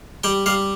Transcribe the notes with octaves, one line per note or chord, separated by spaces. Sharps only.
G3 G5
G3 F5